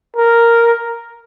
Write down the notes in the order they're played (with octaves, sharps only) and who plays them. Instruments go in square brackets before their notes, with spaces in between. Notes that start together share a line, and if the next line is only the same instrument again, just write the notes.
[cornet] A#4